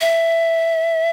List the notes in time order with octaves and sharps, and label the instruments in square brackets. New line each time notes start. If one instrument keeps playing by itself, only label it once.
[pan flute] E5